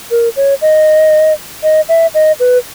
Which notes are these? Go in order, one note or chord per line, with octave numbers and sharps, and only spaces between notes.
A#4
C#5
D#5
D#5
E5
D#5
B4